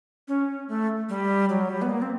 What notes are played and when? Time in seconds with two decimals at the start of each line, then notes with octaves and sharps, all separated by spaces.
0.28 C#4
0.69 A3
1.09 G3
1.49 F#3
1.69 G3
1.82 B3
1.89 A#3
2.02 C4